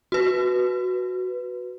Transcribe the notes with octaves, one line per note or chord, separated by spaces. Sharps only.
F#4 B4